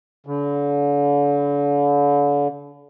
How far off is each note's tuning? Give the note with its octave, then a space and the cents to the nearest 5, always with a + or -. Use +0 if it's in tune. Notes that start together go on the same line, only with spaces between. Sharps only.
D3 -40